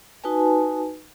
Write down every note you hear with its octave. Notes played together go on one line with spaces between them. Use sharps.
D#4 F#4 B4 G#5 A5